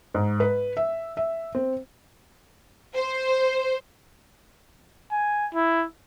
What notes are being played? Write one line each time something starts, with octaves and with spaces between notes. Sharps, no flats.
G#2
B4
E5
E5
C4
C5
G#5
E4